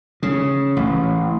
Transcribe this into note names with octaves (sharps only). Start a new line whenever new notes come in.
C#3
A1